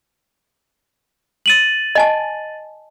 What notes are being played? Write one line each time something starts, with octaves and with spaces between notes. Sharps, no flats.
A6 D#7 F#7
D#5 G#5 A5